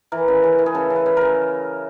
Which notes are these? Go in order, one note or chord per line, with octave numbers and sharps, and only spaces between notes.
E3 A#4
C#3
C#3
E3
G#4
C#3 A4
C#3
B4
C#3
C#3 A#4